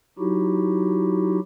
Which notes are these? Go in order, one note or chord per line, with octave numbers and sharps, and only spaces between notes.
F#3 D#4 E4 F#4 G4